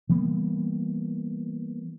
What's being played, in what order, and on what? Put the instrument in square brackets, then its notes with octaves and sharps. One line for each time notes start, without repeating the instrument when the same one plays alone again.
[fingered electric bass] E3 G3 A#3 B3